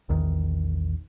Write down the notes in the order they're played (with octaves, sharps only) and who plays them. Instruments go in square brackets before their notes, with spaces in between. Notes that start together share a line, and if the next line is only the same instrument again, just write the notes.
[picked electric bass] A#1 E2 D#3